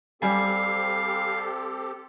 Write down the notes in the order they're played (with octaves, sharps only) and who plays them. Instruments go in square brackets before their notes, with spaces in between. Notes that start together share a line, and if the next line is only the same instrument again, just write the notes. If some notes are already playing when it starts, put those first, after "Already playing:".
[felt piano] G3 G#5 [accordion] C4 G4 A4 [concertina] F5